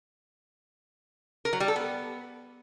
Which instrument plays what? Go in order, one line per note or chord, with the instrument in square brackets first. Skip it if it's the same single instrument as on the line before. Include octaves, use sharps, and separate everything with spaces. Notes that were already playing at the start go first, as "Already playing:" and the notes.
[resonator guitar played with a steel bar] A#4
F#3
G3
A4
B3